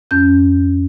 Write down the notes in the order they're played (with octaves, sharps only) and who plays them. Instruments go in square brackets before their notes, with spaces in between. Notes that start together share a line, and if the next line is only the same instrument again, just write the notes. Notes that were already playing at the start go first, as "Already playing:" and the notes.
[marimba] F2 C#4 G6